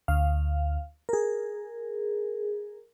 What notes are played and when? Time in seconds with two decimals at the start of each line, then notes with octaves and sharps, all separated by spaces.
0.08 D2 F5
1.09 G#4 A#4